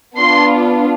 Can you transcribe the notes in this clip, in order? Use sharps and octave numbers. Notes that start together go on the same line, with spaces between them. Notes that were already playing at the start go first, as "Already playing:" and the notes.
B3 D4 F4 C6